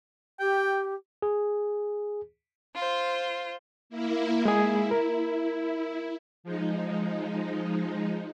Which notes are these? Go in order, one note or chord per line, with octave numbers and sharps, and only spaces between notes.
G4 G5
G#4
F4 C5
A#3 E4
G#3 E4 G#4
A#4
F3 G#3 D#4